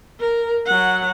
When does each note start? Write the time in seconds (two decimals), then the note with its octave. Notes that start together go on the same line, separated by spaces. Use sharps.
0.20 A#4
0.66 F#3 F#5